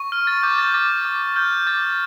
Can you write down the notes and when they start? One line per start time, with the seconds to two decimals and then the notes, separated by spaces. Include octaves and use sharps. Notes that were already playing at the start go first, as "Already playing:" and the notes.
Already playing: C#6
0.12 F6
0.27 A6
0.43 D6 G6
0.58 A6
0.74 D6 A6
1.05 D6
1.36 F6 G6
1.67 D6 A6